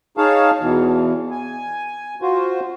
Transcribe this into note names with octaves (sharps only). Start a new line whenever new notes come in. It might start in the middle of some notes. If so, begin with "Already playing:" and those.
D#4 G#4 C#5 F5 A5
E2 B2 E3
G#5
F4 F#4 C5